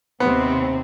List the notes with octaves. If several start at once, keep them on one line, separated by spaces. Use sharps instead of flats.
D#2 C3 B3 C4